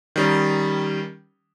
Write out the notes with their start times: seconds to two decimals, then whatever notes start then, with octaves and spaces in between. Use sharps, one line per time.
0.16 D#3 G3 C#4